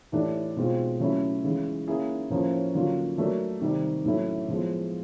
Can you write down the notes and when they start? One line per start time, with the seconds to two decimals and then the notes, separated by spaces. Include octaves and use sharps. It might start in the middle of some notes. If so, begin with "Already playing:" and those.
0.12 A2 E3 A3 D4 G4
0.56 B2 G#3 C4 F4
1.00 C#3 F#3 A3 C#4 E4
1.44 C#3 E3 G#3
1.88 A#3 C#4 E4 G#4
2.30 A2 F3 A#3 C#4
2.74 D3 F#3 A#3 C#4 F4
3.18 F#3 A3 D4 F#4 A#4
3.61 C3 D#3 G3 C4
4.05 A2 F#3 A3 C#4 E4
4.48 A2 F3 G#3 B3